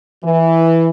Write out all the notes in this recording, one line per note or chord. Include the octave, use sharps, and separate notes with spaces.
E3